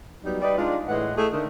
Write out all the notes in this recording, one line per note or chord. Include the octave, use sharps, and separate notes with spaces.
F#3 G3 B3 D#4
G3 D#4 B4 D5
G#3 D4 D#4 F4
A2 E3 G#3 F#5
A3 E4 G#4
D3 D#3 A3 D#4 A#4